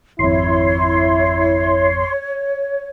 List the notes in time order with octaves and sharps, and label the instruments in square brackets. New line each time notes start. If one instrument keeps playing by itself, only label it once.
[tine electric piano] G#1 F2 [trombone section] E4 [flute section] C#5 [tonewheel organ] C6